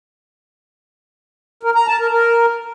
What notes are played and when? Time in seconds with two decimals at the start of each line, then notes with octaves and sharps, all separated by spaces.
1.63 A#4
1.75 A#5
1.87 A5
1.99 A#4
2.11 A#4